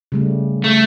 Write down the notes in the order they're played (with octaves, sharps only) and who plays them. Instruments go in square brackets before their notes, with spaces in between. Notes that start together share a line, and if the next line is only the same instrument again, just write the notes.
[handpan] C#3 G3 A3
[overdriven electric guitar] A3